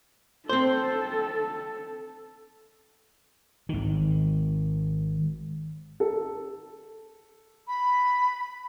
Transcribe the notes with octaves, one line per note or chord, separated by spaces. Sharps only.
C4 A4 C5
G#1 D#3
A4
B5